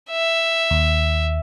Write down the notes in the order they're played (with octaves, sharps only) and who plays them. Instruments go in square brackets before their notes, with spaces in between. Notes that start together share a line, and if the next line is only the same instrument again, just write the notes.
[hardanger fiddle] E5
[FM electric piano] D#2